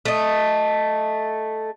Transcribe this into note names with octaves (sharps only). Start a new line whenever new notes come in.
A3 D#5